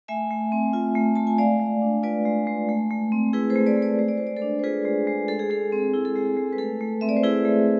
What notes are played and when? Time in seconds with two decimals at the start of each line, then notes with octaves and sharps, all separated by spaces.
0.08 A3 E5 G#5
0.30 A3
0.52 C4
0.73 F4
0.95 A3
1.15 A3 A5
1.27 G#5
1.38 G#3 D5 F5
1.60 G#3
1.82 D4
2.03 F4 B4 D5
2.25 G#3
2.47 G#3
2.69 A3
2.91 A3
3.12 C4
3.33 E4 G#4 B4
3.50 A4 C5
3.56 A3
3.66 B4 D5
3.77 A3
3.82 B4 D5
3.99 G#3 C5
4.08 D5
4.17 G#3 C5
4.27 D5
4.37 A4 C5
4.42 D4
4.59 C5
4.64 F4 G#4 B4
4.85 G#3
5.07 G#3
5.28 G#3 A4
5.39 G#4
5.50 G#3 A4
5.72 C4
5.93 E4 G#4
6.05 A4
6.16 G#3 G#4
6.37 G#3
6.53 B4
6.58 A3 A4
6.81 A3
7.01 C4 E5
7.09 D5
7.16 C5
7.24 E4 G#4 B4
7.45 A3